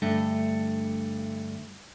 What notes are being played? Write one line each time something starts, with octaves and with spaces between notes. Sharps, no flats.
G2 D3 A3